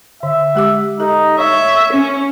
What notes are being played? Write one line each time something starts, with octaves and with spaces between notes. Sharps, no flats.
D3 E5
G#3 G4 D6
D#4 G4 A4
C#5 E5
C#4